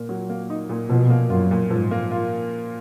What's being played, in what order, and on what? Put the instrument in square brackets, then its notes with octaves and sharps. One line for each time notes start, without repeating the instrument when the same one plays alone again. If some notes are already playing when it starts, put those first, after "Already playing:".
Already playing: [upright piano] A#2 A#3
F#3
A#3
D#4
A#2
[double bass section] B2 [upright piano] F3
[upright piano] A#3
[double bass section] F#2 [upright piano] F4
[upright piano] A#2
[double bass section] G#2 [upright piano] F3
[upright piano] A#3
F4